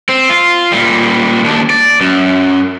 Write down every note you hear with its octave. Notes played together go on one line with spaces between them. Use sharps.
C4
F4
A#2 G3
D#2 D4
D5
F#2